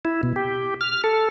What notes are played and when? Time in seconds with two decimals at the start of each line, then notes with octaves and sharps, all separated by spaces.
0.05 E4
0.23 B2
0.36 G4
0.81 F6
1.04 A4